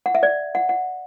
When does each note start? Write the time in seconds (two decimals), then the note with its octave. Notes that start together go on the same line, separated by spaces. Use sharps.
0.06 F#5
0.15 E5
0.23 D5
0.55 F#5
0.69 F#5